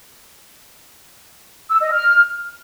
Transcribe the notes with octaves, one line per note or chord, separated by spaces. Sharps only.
E6
D#5
F6